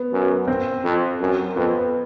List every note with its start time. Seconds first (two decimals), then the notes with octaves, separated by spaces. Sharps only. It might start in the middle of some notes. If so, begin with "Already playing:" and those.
Already playing: B3
0.13 F#2
0.48 C4
0.84 F2
1.20 F#2
1.56 F2 B3